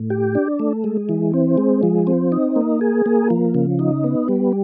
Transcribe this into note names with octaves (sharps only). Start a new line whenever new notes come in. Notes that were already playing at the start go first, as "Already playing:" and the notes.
Already playing: A2
G4
D4
A3
G#3
E3
C4
G#3
F3
C4
D#4
A#3
G#4
A#3
F3
C#3
D#4
B3
G3